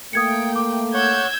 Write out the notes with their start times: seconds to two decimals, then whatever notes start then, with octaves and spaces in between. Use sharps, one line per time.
0.13 A3 A#3 G5 D#6 G#6 C#7
0.56 D6
0.94 C#5 F#5 E6 G6 G#6